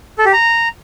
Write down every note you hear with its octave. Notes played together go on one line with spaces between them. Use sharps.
A4
G4
A#5